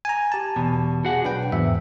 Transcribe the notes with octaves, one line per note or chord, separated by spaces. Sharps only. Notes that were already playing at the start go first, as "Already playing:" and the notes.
G#5 A#5
G4 A5
E2 B2
F#4 G#4 F#5
B1 D4 B4 G5
E2 G#2 E5